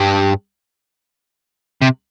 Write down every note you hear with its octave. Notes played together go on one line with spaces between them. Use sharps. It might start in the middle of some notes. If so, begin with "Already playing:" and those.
Already playing: G2
C3